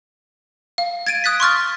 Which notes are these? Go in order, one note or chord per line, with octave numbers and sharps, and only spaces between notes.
F5
G#6 A6 D7 D#7
D#6 F#6 A6 B6
C6 C#6 F6 A6